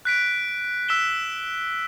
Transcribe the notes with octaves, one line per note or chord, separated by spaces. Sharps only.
F#6 B6 D7
E6 B6 E7 G7